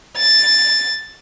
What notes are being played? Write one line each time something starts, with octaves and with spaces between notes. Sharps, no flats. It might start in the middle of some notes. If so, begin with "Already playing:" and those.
A6